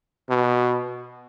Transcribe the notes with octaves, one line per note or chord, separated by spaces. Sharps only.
B2